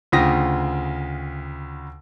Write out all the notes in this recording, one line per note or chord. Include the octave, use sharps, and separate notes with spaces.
D2 C#3 F4 G5 D#6 A#6